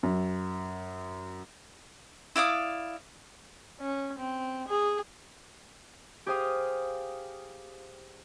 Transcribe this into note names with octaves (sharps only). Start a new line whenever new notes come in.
F#2
E4 D5 F5 D#6
C#4
C4
G#4
G4 G#4 C5 F5 G5 D#6